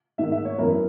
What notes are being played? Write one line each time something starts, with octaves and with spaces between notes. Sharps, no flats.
G#2 D#3 A#3 E5
E5
C#5
F#2 E3 B3 E4 A#4